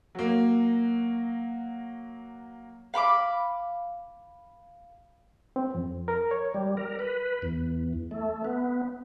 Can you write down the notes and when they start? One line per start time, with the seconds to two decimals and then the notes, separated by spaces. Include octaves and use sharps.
0.15 F#3 A#3
2.94 F5 B5 C#6 D6
5.56 C4
5.75 F2
6.08 A#4
6.31 C#5
6.54 G3
6.77 A#4
6.99 B4
7.42 E2
8.11 A3
8.45 B3